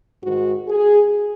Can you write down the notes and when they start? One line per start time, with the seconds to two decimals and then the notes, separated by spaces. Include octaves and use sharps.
0.21 G#2 D#3 F#4
0.68 G#4